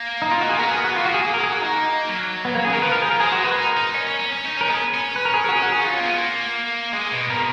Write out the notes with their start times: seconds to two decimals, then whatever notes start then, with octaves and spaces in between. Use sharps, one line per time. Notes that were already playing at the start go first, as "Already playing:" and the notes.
Already playing: A#3
0.22 D#4
0.31 F4
0.41 F#4
0.49 G#4
0.58 B3 A#4
0.71 G#4
0.84 F#4
0.96 A#3 F4
1.05 F#4
1.14 G#4
1.25 G#4
1.34 A#4
1.43 G#4
1.52 F#4
1.62 D#4
2.09 F#3
2.45 B3
2.55 A#3
2.65 C#3 G#4
2.73 D#3 A#4
2.82 F3 B4
2.92 A#4
3.02 G#4
3.11 A#4
3.20 G#3 G#4
3.32 F#4
3.45 B4
3.57 D#4 A#4
3.77 D#4
3.94 C#4
4.07 C#4
4.20 C#4
4.32 C#4
4.45 D#4
4.57 C#4 A#4
4.69 B3 G#4
4.94 C#4
5.16 B4
5.25 A#4
5.34 G#4
5.44 A#4
5.49 F#4
5.53 G#4
5.62 F#4
5.72 G#4
5.81 D#4 F4
5.94 C#4
6.00 A#3
6.06 B3
6.18 A#3
6.93 G#3 G#4
7.12 B2
7.30 B2 A#4